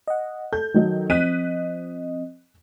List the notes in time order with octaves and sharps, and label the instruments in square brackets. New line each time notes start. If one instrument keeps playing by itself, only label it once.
[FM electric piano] D#5 F#5
[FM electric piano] A4 [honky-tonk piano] G6
[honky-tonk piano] D#3 F#3 D#4
[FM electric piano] F3 C4 D#5 [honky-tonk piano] F#6 B6 D#7